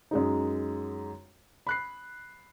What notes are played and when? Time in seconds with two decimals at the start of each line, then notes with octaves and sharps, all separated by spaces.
0.11 F#2 G#3 D#4
1.67 B5 F#6 C7